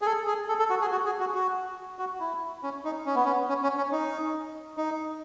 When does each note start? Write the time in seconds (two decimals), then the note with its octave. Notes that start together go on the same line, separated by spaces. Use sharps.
0.02 G#4
0.06 A4
0.27 G#4
0.49 A4
0.59 A4
0.70 F#4
0.81 G#4
0.92 F#4
1.06 G#4
1.20 F#4
1.34 F#4
1.99 F#4
2.20 E4
2.63 C#4
2.85 D#4
3.06 C#4
3.15 B3
3.25 C#4
3.49 C#4
3.63 C#4
3.77 C#4
3.92 D#4
4.77 D#4